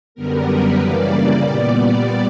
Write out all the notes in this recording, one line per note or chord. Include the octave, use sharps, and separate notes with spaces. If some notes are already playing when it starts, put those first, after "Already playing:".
F#2 D3 G3 B3 A#4
B4
C#3 E3 G3 A#3 D5
A#2 G3 B3 D5